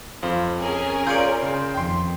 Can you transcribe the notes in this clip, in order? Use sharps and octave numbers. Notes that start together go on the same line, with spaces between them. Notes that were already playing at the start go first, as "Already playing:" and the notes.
F2 F3
C#4 G#4 A#4
F4 C#5 D5 G6 D7
C#3 C6
F2 D#3 G5 C6